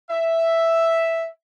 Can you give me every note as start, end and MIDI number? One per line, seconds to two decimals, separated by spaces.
0.11 1.29 76